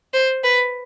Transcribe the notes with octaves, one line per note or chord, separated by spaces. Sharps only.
C5
B4